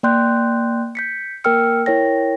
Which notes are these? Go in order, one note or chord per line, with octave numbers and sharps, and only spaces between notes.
A#3 D5 G5 C6 F#6 G6
G6 B6 C#7
A#3 A#4 G5 E6 F6 C#7
E4 A#4 C#5 G5 A#6